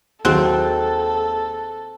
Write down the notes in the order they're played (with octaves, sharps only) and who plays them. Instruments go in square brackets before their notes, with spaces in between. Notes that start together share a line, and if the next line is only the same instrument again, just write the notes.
[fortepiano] D#2 F#3 [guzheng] C4 [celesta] G#4 F#6 [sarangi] A4